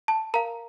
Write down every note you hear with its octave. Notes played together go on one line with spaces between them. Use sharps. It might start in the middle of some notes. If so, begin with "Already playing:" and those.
A5
A#4 F5 A#5